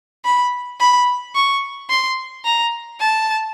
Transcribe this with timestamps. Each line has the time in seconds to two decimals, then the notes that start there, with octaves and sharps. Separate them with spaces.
0.25 B5
0.80 B5
1.35 C#6
1.90 C6
2.45 A#5
3.00 A5